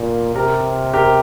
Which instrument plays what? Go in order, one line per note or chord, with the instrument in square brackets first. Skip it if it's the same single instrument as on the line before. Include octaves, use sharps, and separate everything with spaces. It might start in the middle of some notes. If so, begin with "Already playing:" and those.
Already playing: [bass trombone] A#2
[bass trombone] C3 [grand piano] G4 A#4
[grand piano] G4 A#4